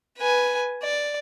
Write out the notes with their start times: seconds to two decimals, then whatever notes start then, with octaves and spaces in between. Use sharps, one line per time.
0.19 B4 G#5
0.83 D5